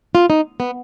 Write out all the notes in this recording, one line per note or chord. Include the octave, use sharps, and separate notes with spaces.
F4
D#4
B3